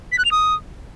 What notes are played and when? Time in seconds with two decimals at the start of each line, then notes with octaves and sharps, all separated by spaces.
0.12 B6
0.19 F#6
0.25 F7
0.32 D#6